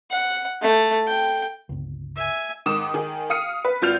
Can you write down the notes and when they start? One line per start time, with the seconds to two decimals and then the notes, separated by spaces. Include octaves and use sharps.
0.11 F#5
0.62 A3
1.08 G5
1.69 G1 C#2
2.16 E5 G#5
2.66 G#2 D#3 D6 D#6 E7
2.94 D#3 G#4
3.30 F5 D#6 F6 C#7 D#7
3.65 B4
3.82 G#1 F4 F6 G6 F7